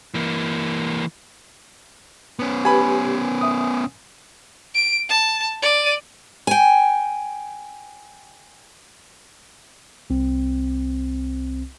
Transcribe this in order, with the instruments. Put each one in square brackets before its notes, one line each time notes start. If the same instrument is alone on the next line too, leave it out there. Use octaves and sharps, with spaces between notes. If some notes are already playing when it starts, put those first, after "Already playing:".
[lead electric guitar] E3 A#3
B3 C#4
[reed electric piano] G4 B4 [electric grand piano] G#5 B5
[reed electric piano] E5 D#6
[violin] D7
A5
D5 D#7
[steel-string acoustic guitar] G5 G#5
[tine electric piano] C2 C4